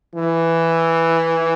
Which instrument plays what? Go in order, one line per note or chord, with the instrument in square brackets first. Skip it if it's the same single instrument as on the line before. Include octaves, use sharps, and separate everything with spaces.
[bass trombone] E3